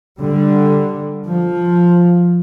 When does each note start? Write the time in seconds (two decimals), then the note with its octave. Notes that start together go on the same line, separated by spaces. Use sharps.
0.19 D3 G3
1.27 F3